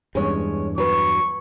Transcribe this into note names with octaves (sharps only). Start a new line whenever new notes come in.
E2 G2 G#3 C#4 C#5
F#3 B4 C#6